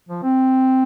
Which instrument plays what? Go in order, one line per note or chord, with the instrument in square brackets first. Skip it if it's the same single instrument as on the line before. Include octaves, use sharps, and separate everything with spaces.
[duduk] F3
C4